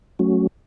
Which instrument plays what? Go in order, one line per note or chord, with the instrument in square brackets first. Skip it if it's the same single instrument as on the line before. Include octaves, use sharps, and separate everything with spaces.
[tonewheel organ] F#3 A3 C#4 F#4